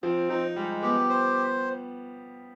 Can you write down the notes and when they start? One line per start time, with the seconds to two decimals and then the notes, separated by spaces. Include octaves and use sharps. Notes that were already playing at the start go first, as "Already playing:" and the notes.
0.03 F3 C4
0.29 F3 D#4
0.56 G3 G#3
0.83 B3 G4
1.09 C5